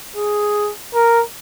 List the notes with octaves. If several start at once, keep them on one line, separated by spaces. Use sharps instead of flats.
G#4
A#4